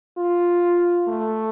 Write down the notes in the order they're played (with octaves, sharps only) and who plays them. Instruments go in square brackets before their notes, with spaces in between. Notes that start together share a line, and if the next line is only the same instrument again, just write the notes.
[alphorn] F4
A3